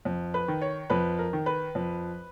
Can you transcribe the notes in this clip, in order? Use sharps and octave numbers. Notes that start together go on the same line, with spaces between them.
F2
B4
D#3
C#5
F2 B4
A#4
D#3
B4
F2